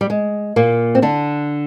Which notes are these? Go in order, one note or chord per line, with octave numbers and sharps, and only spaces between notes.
G3
G#3
A#2 A#3
C4
D3 D4